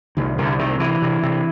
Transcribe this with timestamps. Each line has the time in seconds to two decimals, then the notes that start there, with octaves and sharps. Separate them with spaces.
0.17 C2 D#3
0.38 C2 D3
0.59 C3 D#3
0.80 C3 E3
1.02 C3
1.23 C3